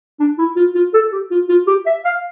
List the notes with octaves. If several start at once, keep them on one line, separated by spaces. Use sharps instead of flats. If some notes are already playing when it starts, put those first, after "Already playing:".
D4
E4
F4
F4
A4
G4
F4
F4
G4
E5
F5